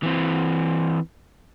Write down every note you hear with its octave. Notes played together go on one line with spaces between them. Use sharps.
E3 C4